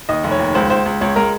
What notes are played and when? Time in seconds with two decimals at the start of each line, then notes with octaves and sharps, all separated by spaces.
0.09 D#2 D#5
0.24 F1
0.31 C#5
0.40 D#2
0.54 C#2 C5
0.70 C#2 C5
0.86 C#2
1.01 C#2 C#5
1.16 G#3 A#4